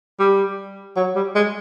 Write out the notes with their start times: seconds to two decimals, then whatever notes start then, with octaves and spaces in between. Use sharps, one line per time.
0.19 G3
0.96 F#3
1.15 G3
1.35 G#3